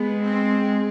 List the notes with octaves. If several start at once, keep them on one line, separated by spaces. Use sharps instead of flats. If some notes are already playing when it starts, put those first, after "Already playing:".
Already playing: G#3 B3
C4